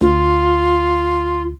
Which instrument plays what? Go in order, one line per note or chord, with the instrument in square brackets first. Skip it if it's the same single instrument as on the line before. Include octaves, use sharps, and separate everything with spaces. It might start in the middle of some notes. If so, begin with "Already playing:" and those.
[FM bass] D2 [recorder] F4